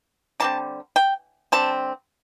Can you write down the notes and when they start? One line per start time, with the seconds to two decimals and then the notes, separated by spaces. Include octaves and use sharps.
0.40 D3 G3 C4 A5
0.96 G5
1.52 D3 G3 C4 A5